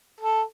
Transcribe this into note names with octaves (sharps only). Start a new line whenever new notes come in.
A4